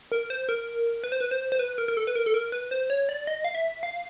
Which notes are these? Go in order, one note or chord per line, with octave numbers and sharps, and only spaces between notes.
A#4
C5
A#4
B4
C5
B4
C5
C5
B4
A#4
A#4
A4
B4
A#4
A4
A#4
B4
C5
C#5
D5
D#5
F5
E5
F5